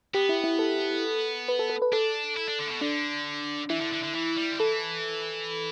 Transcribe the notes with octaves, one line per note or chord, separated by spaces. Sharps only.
B3 G4
E4
E4
A4
B4
A4
A4
B4
D4 A4
E4
D4
D3
A2
B2
D3 D4
E3 E4
D3
D3
D3
E3
G3
D3
E3 A4